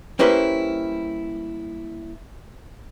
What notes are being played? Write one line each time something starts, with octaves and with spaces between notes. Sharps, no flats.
G3 A#3 C#4 E4 B4 C5